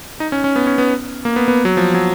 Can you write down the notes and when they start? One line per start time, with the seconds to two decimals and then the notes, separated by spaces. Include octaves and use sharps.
0.20 D#4
0.32 C#4
0.44 C#4
0.56 B3
0.67 C#4
0.78 B3
1.25 A#3
1.36 B3
1.48 B3
1.65 F#3
1.77 F3
1.94 F#3